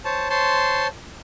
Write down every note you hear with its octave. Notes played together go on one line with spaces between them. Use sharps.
C5 C#5 A5
C5 C#5 A5 C6